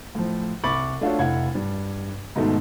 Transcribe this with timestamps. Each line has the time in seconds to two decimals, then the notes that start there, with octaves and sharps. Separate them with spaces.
0.15 A2 F3
0.64 C2 B5 C#6 D6 A6 F#7
1.01 A3 D4 F4 F#4 C#5
1.18 F1 E4 F5 F#5 G#6
1.55 G2
2.36 G#2 B2 D#3 A3